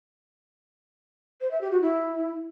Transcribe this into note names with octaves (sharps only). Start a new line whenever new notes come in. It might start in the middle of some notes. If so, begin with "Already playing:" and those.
C5
E5
G4
F#4
E4